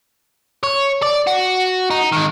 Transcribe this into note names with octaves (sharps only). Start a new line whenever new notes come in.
C#5
D5
F#4
D#4
D#3 G#3